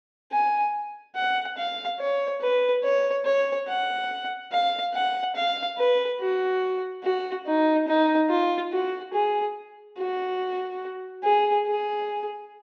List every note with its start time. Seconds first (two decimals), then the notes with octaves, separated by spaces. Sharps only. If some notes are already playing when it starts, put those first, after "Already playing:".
0.32 G#5
1.16 F#5
1.57 F5
1.99 C#5
2.41 B4
2.83 C#5
3.25 C#5
3.68 F#5
4.51 F5
4.94 F#5
5.35 F5
5.78 B4
6.20 F#4
7.03 F#4
7.46 D#4
7.87 D#4
8.30 F4
8.72 F#4
9.13 G#4
9.98 F#4
11.24 G#4
11.66 G#4